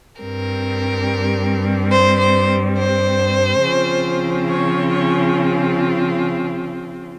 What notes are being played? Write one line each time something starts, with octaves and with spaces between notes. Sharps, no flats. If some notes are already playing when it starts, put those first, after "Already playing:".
G2 G3 C4 A#4
C5
C5
C5
C#3 F3 C4 F4
C#5
C#5